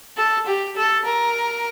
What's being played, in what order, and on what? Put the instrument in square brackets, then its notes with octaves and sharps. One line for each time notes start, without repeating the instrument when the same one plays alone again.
[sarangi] A4
G4
A4
A#4